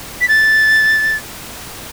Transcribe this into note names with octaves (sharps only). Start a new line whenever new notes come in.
B6
A6